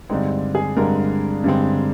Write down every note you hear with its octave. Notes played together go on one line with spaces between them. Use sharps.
G2 D3 G#3 C4 D#4
G#4
G2 D3 G#3 C4 A#4
G2 D3 G#3 C4